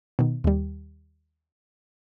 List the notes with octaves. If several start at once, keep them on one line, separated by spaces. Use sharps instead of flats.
B2 D#3
D#2 G3